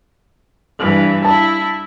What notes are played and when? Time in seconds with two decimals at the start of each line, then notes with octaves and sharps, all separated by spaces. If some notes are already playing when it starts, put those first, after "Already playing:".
0.79 G2 E3
1.25 E4 A5